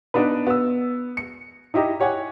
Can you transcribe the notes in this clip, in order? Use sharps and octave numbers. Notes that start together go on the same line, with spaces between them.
B3 D4 D#4 B4
B3 E6
C#7
D#4 E4 G4 D#5 A#5
G4 C#5 F#5 G#5